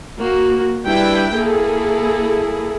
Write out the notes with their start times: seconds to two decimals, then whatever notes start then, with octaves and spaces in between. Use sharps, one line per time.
0.18 A#3 F#4
0.85 G3 D4 E4 B4 G5
1.35 A#3 E4 G#4 A4